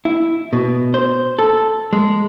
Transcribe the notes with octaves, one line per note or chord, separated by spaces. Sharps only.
E4
B2
C5
A4
G#3